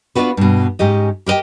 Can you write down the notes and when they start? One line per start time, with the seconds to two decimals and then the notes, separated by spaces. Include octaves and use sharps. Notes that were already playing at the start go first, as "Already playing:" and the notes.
0.15 B3 D4 D#4 F4 F#4 B4
0.37 G2 B2
0.79 G#2 C#4 G4 D#5
1.26 G4 A#4 B4 D#5 G5